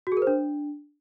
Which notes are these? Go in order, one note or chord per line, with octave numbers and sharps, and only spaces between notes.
F#4
G#4
A#4
C5
D4